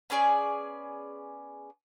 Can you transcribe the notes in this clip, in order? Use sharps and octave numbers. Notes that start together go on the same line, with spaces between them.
B3 C#4 G#4 D5